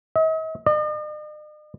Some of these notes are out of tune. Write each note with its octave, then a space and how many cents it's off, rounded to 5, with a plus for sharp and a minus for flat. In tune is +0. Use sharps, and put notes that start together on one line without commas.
D#5 +45
D#5 -45